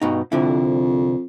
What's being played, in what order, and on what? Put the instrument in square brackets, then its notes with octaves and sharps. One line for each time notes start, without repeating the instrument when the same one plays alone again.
[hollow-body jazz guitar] G2 B2 D#4
[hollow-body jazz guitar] C2 D3 E4 [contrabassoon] F2